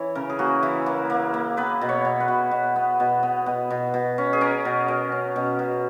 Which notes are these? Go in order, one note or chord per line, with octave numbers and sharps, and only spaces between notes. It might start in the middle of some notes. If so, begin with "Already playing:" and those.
Already playing: E3 C#5
C#3 A#4
G#4
A#3 F#4
E3 E4
A#3
A#3
A#3
B3 B4
B2
C#5
B2
B4
B2
B2
B3
B2
B3
B2
B2
B2
C#4
G#4
C#4 A#4
B2
B2
C#4
B2
B2